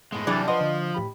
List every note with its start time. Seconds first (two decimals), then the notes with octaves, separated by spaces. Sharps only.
0.12 A2 G#3 B3
0.27 C3 E3 F#3 G3 D4 G#4 A6
0.48 F3 B4 D#5 F#5 C6
0.61 D3
0.95 A2 G4 B5